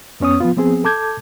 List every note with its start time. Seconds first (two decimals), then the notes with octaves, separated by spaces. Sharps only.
0.20 F2 B3 C#4 C#5 D#6
0.40 F3 B3 F4
0.56 F3 B3 C4 G#4
0.84 A4 A5 D6 G6 G#6